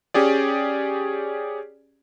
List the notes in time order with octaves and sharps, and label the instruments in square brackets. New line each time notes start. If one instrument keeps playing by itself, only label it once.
[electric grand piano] C#4 G4 G#4 D5